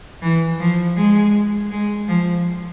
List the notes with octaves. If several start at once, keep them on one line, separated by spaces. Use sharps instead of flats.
E3
F3
G#3
G#3
F3